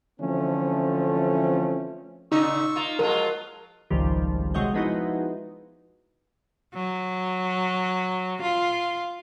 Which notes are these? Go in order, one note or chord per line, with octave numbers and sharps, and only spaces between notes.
D3 E3 F3 A3 C4 C#4
A#2 C#3 D#4 C#6 E6
A#3 F4
F3 F#3 G#3 F4 A#4
G#1 C#2 G#2 D#3 F3 G3
C3 G#3 F#4 C#5 D#5 G6
F3 G#3 B3 D#4 E4 F#4
F#3
F4